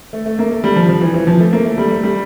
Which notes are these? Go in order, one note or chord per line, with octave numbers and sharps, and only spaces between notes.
A3
A3
A#3
A3
G3
F3
F3
E3
E3
F3
A3
A#3
A3
G3
A3
G3